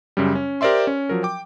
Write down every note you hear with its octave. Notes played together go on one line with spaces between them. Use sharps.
F#2 C#3 G3
C#4
G4 A#4 C5 D5 E5 C6
C#4
F3 F#3 A#4
G5 D6